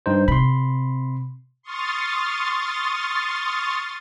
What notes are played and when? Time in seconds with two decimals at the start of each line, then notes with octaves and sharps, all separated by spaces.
0.06 G2 D#4 C5
0.28 C3 B5 C6
1.63 C6 C#6 D#6 F6 A6